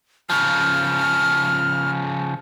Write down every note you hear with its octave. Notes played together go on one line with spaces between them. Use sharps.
C#3 F3 F6